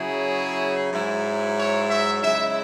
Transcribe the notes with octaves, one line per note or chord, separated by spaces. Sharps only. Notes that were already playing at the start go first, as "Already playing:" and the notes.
Already playing: C#3 F#3 E4 G#4
G#2 F#3 E4
C#5
E5
C#3 G#3 E4 E5